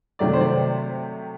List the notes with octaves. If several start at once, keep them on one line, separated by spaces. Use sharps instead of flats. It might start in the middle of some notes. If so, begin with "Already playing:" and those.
C3 D#3 F#3 A3 D5
C5
D5